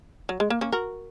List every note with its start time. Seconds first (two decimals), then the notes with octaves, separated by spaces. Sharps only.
0.29 F#3
0.40 G#3
0.50 A#3
0.61 A#3 C#4
0.72 F#4 A#4